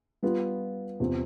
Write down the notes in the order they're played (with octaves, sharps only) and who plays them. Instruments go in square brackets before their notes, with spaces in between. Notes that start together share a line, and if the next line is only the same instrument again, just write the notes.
[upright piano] G3 B3 F4
E2 C3 F3 C4